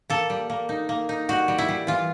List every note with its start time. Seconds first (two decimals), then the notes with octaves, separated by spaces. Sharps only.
0.10 A#3 A4
0.30 G3
0.50 A#3
0.69 D#4
0.89 A#3
1.09 D#4
1.29 G3 F#4
1.48 G3
1.58 E4
1.69 G3
1.87 E3 F4